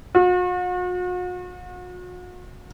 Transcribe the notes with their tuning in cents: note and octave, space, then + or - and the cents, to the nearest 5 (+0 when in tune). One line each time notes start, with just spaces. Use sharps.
F#4 -45